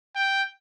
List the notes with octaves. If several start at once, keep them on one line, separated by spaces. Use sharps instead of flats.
G5